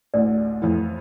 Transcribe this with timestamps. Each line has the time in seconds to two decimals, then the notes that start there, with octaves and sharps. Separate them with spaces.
0.14 A1 D2 D5
0.62 F2 A2 E3